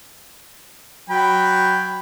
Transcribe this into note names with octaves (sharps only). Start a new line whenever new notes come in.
F#3 G5 B5